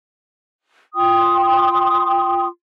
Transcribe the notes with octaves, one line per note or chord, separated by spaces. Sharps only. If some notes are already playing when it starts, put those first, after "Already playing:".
F4 G5 C6 D#6